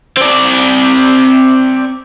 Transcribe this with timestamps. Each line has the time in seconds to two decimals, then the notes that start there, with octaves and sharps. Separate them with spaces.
0.17 C4 D5